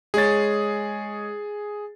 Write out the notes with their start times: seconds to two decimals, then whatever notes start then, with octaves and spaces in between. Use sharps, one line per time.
0.14 G#3 G#4 C#5 A6